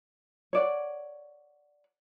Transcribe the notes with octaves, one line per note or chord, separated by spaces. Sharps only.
C#5 D5 F#5